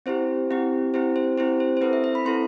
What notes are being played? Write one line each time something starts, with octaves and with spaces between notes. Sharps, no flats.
C4 E4 G4 C5
C4 E4 G4
C4 E4 G4 C5
C5
C4 E4 G4 C5
C5
C5
C4 E4 A4 B4
E5
E5
B5
C4 E4 A4 C6